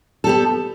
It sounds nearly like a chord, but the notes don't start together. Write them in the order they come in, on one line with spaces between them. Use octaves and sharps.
A4 G4 B3